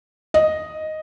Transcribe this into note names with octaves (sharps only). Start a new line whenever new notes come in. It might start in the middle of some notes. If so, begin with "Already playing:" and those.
D#5